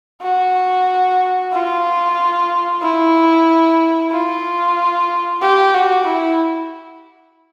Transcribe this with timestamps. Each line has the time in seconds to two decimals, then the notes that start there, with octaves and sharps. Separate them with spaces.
0.22 F#4
1.52 F4
2.82 E4
4.12 F4
5.42 G4
5.74 F#4
6.06 E4